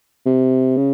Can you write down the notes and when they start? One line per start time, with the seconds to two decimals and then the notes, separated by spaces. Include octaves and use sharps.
0.26 C3
0.77 C#3